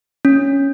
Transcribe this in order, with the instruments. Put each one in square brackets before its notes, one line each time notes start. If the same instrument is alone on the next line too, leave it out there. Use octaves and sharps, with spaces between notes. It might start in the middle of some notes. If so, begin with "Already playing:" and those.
[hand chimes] C#4